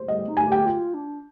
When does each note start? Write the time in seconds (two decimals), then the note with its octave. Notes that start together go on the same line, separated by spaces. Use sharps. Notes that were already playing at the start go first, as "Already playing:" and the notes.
Already playing: C5
0.08 G3 D#5
0.27 D#4
0.37 G#5
0.47 G4
0.52 G5
0.65 F4
0.94 D4